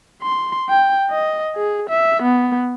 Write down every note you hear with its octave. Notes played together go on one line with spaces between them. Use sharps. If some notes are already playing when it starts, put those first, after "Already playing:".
C6
G5
D#5
G#4
E5
B3